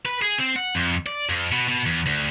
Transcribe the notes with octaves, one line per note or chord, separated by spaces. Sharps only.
B4
G#4
C4
F#5
F2
D5
F2
B2
B2
E2
D2